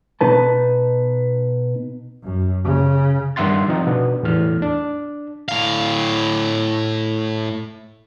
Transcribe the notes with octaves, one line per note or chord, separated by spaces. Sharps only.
B2 D#4 B4 A5
F#2
C#3
G2 D#3 E5 F#5 C6 A6
F3 C4 D#4
B2 B3 D4
E2 A2 F6
D4
A2 F5